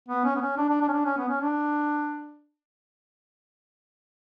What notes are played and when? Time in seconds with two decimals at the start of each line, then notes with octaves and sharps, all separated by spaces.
0.08 B3
0.24 C#4
0.36 B3
0.41 C#4
0.57 D4
0.69 D4
0.81 D4
0.88 C#4
0.92 D4
1.05 C#4
1.17 B3
1.29 C#4
1.40 D4